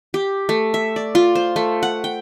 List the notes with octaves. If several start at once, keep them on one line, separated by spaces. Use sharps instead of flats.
G4
A3
E5
D5
F4
C5
A3
F#5
G5